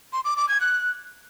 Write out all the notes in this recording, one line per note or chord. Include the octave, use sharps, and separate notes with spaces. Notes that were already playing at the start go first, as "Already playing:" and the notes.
C6
D6
D6
G#6
F#6